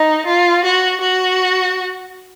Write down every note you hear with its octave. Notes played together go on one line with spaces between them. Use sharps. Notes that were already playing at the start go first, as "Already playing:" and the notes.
Already playing: D#4
F4
F#4
F#4